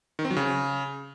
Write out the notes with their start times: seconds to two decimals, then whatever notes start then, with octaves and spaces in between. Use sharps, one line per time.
0.19 D#3
0.25 C4
0.31 F#3
0.36 C#3